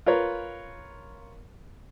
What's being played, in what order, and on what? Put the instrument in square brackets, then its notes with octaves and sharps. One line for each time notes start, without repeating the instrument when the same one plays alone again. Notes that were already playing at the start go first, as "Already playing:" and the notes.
[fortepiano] F4 A#4 B4 C#5